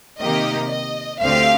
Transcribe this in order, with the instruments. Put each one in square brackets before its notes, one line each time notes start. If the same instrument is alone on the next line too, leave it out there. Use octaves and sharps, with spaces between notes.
[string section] C3 D#3 A#3 D#4 G4 [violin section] D#5
[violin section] D#5
[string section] D2 D3 A3 C4 G4 [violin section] F5